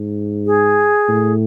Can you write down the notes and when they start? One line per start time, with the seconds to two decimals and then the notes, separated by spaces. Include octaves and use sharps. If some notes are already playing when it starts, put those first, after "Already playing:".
Already playing: G#2
0.46 G#4
1.09 A2